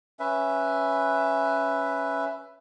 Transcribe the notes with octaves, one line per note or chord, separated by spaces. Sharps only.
C#4 B4 E5